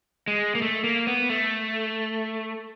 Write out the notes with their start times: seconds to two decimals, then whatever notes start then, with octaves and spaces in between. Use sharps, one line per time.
0.28 G#3
0.55 A#3
0.62 A3
0.84 A#3
1.07 B3
1.30 A3